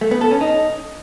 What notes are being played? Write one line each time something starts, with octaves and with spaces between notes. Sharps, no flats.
A3
B3
A4
C#4
D#4